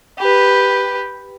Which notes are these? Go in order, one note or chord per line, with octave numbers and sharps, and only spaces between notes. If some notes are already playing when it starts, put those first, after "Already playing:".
G4 B4